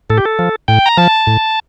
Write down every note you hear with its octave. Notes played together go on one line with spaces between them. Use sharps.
A2 A4
G4
A4
F3
A2 G5
A#5
F3 A5
A2